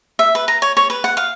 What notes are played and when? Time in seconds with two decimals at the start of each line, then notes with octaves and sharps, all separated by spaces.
0.19 E5
0.35 B4
0.48 A#5
0.62 C#5
0.77 C#5
0.90 B4
1.04 F#5
1.17 F5